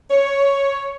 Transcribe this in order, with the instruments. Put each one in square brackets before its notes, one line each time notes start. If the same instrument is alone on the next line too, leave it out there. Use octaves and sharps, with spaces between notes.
[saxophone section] C#5